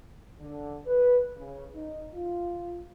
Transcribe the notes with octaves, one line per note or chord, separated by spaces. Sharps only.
D3
B4
C#3
D#4
F4